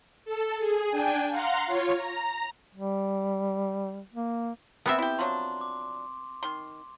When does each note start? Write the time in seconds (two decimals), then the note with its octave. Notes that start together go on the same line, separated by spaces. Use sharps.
0.25 A4
0.59 G#4
0.91 D4 G5 G#5
1.29 F5 F#5 A#5 C6
1.66 F4 C#5
1.95 A#5
2.75 G3
4.13 A#3
4.86 D3 B3 C4 A#4 E5 C6
4.99 E4 G4
5.19 F3 F#3 D4 C6
5.61 D6
6.43 D#3 C6